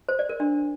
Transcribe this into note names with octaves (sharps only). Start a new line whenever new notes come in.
C5
D5
A#4
D4